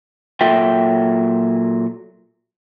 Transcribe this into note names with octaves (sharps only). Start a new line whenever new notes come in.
A#2 F#3 F4 A4 E5 G5